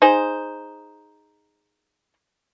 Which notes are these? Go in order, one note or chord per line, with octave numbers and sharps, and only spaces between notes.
D#4 G#4 C5